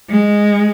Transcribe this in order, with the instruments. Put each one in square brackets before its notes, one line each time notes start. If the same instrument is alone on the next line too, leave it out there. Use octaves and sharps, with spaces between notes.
[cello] G#3